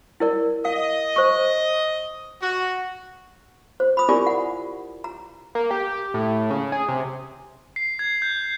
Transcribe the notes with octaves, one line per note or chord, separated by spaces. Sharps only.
E4 A#4 D5
D#5 F5
C5 C#6
F#4
C5
B5 D#6
E4 F4 G4 A#4 D5 G#5
F#5
A#5
A#3
G4
A2
C#3
G#4
C3
C7
G#6
G6